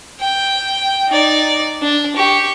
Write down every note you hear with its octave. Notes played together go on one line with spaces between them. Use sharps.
G5
D#4 D5
D4
G4 C#6